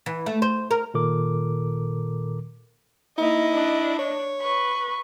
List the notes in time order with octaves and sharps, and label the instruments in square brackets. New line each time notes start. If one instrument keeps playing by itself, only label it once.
[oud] E3
A3
C5
A#4
[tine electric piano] A#2 D#3 A4 A#4 D6
[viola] A#3 D#4 [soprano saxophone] E4 [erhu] D#5
[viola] D4
[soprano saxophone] C#5
[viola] B4 [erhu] C#6